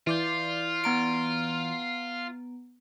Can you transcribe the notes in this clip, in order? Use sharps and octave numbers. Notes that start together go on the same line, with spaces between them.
E3 F4 D5 G6
B3 A#5 D7